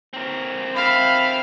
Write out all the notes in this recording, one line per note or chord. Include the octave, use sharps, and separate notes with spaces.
C4 A#4
E5 F5 B5